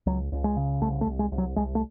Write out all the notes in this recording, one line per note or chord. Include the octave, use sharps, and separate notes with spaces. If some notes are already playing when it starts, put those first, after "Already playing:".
C#2 F#3
C#2
G#3
C#3
C2 A3
A3
C2
G#3
C2
F#3
C2 G#3
A3